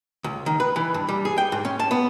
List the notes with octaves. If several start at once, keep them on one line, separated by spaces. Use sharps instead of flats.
C#2
D#3
B4
E3
G2
G3
G#4
G5
G#2
C#4
A5
B3